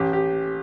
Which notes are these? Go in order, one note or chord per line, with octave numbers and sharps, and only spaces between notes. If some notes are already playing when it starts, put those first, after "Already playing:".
Already playing: A1 G4
G4